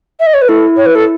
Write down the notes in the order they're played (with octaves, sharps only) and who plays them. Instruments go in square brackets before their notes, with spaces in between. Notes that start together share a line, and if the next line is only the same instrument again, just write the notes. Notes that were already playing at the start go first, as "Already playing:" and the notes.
[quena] E5
D#5
C#5
B4
[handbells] E4 [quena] A4
[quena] C#5
B4
A4